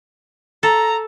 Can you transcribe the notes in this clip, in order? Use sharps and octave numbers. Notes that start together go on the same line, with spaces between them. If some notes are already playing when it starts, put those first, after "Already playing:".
A4 A#5